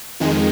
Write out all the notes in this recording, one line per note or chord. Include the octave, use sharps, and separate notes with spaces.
F2 D#3 G#3